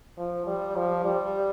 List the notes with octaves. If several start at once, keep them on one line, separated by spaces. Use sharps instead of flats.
F3
G3
F3
G3